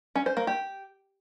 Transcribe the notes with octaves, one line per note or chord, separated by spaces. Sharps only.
C#4
C5
A#3
G4